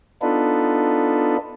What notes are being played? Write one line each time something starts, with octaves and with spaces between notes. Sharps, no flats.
B3 D4 D#4 F4 A4 B4